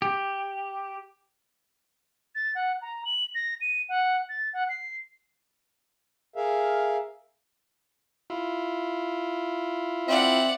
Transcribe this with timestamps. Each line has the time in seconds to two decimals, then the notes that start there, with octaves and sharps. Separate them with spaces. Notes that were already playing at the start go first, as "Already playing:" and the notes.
0.02 G4
2.35 A6
2.55 F#5
2.82 A#5
3.05 F#7
3.35 A#6
3.61 D#7
3.89 F#5
4.29 A6
4.53 F#5
4.69 C7
6.36 G#4 A#4 E5 F5
8.30 E4 F4
10.08 C4 D5 E5 F#5